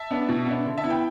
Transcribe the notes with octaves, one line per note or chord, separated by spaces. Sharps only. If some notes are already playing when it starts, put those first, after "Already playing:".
Already playing: E5 A5
B3 D4
B2
B3 D4
D3
E5 A5
B3 E4
G5 B5